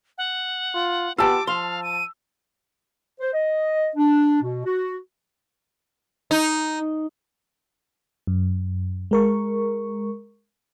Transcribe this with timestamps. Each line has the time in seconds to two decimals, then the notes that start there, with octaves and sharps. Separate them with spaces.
0.18 F#5
0.74 F4
1.18 B3 F4 G4 A5 D6 E6
1.47 F3 F5 C6
1.83 D#7
3.20 C5
3.34 D#5
3.96 D4
4.43 B2
4.66 F#4
6.31 D#4
8.27 F#2
9.11 G#3 A#4 C#6